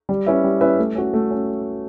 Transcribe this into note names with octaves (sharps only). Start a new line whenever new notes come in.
G3
C#4 E4 B4 E5
G3
C#4 E4 B4 E5
A3
C#4 F#4
A3
C#4